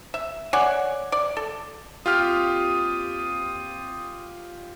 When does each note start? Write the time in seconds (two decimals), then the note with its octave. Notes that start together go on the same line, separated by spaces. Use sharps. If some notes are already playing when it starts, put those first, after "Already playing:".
0.14 E5
0.53 C#5 D5 F#5 G#5
1.12 D5
1.37 A4
2.06 D#2 C4 F4 G4 D#6 F6